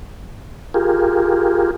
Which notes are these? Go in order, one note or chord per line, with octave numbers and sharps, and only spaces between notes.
F4 G4 G#4 A#4